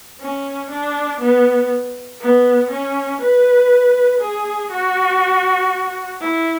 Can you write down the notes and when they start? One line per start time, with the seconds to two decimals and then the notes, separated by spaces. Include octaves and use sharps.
0.21 C#4
0.71 D4
1.21 B3
2.21 B3
2.71 C#4
3.21 B4
4.21 G#4
4.72 F#4
6.21 E4